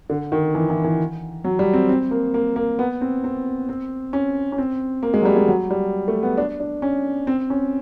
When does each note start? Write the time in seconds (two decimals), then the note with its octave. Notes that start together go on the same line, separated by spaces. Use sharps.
0.10 D3
0.32 D#3
0.55 E3
0.70 E3
0.84 E3
1.44 F#3
1.59 G3
1.74 C4
1.89 C4
2.11 A#3
2.34 A#3
2.56 A#3
2.79 B3
3.01 C4
3.24 C4
3.69 C4
4.13 C#4
4.52 C#4
4.58 C4
5.03 A#3
5.14 G#3
5.21 F#3
5.25 G3
5.36 G#3
5.48 F#3
5.70 G3
6.08 A3
6.23 B3
6.38 D4
6.60 D4
6.82 C#4
7.27 C4
7.50 C#4